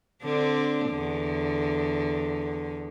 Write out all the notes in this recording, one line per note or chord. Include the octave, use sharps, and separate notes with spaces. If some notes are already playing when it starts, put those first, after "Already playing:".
D3 C4 D4
E2 D3